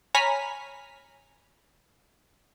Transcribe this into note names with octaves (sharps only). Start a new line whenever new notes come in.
C#5 G#5 A#5 B5 F6 B6